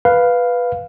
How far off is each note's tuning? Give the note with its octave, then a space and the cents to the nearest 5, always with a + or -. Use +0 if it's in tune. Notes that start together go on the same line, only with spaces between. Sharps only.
B4 +0 F5 +0